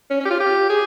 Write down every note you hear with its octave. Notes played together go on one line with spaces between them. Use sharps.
C#4
C#4
G4
F4
G4
G#4